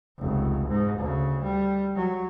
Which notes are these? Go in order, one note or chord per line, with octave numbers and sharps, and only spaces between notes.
F1 C#2
G#2
D2 C#3
G3
F#3